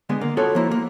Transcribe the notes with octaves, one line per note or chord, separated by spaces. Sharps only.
D3 G#3 B3
A#3
B3 F4 F#4 A4 C#5
F3 A#3 E4
A#3